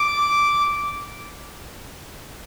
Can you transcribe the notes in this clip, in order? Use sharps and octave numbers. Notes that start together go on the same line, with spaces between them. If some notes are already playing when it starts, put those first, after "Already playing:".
Already playing: D6